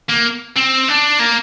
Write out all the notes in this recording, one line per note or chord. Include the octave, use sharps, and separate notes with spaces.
A#3
C4
D4
A#3